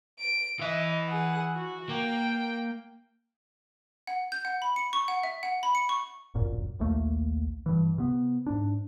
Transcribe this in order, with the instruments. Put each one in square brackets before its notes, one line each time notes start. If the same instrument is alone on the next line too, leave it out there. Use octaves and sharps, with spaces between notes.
[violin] D7
[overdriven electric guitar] E3 E5 [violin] D#5
[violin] G#4 F#5
F#4
[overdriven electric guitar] A#3 [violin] G5
[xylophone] F#5
G6
F#5
B5
C#7
C#6
F#5
E5
F#5
B5
C#7
C#6
[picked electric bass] D1 G1 F#2 A#2
A#1 D#2 A3 A#3
G2 E3
C3 B3
G#2 D4